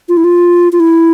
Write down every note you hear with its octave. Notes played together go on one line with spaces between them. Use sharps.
F4
E4
F4
F4
E4